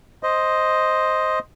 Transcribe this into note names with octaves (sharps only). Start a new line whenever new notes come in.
C5 D#5